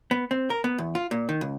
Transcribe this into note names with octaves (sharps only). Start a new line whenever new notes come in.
B3
C4
A#4
B3
E2
F4
A#2
D#3
C#2